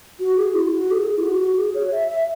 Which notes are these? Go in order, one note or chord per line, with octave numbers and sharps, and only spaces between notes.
F#4
G#4
F#4
E4
F#4
A4
G#4
E4
F#4
F#4
G#4
C#5
E5
E5